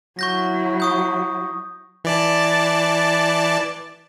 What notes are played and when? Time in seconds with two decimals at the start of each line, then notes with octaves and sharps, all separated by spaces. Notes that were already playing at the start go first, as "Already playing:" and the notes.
0.19 F#3 E4 C#6 G6 A#6
0.80 C#6 D#6 G6
2.04 E3 D5 A5